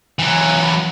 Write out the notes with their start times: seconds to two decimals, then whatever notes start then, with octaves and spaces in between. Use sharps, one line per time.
0.19 E3 F#3